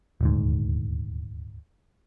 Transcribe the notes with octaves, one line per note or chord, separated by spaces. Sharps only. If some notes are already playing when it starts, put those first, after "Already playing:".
D#1 D2 G#2